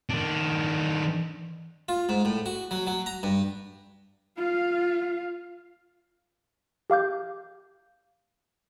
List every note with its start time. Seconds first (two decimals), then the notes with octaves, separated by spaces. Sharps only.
0.10 D#3 D4
1.89 F4
2.09 G#2
2.25 A2
2.46 F#4
2.71 F#3
2.87 F#3
3.06 A#5
3.23 G2
4.37 F4 F5
6.90 G4 F5 D6 G6